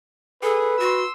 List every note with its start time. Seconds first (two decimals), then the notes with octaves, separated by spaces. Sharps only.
0.43 G#4 A4 B4
0.80 F#4 C6 E6